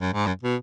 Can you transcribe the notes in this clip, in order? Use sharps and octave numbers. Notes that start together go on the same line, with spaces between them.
F#2
G#2
F#2
B2